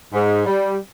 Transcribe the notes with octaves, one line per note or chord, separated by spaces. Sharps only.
G#2
G3